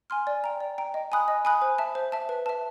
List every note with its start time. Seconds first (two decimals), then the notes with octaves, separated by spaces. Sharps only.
0.10 G#5 C6 F6
0.27 D5
0.44 G5 A#5
0.60 D5
0.78 G5 A#5
0.94 D#5
1.12 G#5 B5 D#6 F#6
1.28 D#5
1.45 G#5 B5 D#6 F#6
1.62 C5
1.78 E5 A5
1.95 C5
2.12 E5 A5
2.29 B4
2.46 E5 A5